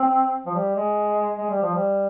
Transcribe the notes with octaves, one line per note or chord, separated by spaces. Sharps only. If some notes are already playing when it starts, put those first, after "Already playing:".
Already playing: C4
F3
G3
G#3
G#3
G3
F3
G3